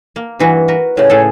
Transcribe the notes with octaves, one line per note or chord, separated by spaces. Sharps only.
A#3
G2 E3 F#4
F#4 A#4 B4
A2 C#3 C#5
A2 G#4 A4